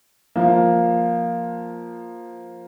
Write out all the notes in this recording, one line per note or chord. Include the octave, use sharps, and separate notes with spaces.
F3 A#3